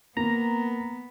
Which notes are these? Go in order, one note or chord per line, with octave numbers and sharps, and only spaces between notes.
A#3 B3 A#5